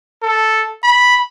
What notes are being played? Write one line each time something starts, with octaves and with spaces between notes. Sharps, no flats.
A4
B5